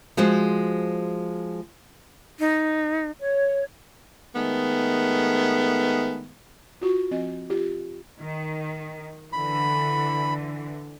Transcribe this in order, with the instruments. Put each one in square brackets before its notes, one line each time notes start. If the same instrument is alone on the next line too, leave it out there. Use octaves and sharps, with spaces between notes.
[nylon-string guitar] F3 G#3 F#4 C5
[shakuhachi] D#4
[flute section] C#5
[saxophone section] D#3 G#3 A3 B3
[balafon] F4 F#4 C#6
F3 C4 D#5
F4 G4
[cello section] D#3
[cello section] D3 E3 [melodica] B5